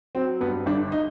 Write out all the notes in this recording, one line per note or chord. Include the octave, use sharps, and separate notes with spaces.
F#3 C4
G2 B3
G1 D4
D#4